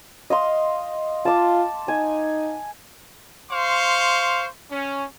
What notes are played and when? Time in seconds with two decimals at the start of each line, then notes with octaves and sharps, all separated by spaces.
0.30 D#5 F5 C6
1.25 F4 A5 D6
1.88 D#4 G#5
3.51 C5 F5 C6 C#6
4.71 C#4